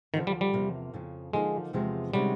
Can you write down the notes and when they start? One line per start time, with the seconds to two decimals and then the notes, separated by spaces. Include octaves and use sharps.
0.14 D2 D3 D#3 F3
0.27 G3
0.41 G3
0.53 E2 C3 F3 A#3
0.94 F2 C#3 F3
1.33 D3 F3 G#3 A#3 D#4
1.73 E2 C3 F3 G#3
2.13 C3 D#3 G3 G#3 C#4 F#4